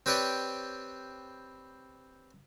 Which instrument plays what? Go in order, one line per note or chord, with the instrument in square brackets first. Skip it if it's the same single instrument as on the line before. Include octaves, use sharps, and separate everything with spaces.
[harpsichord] C4 G4 B4 C#5 D5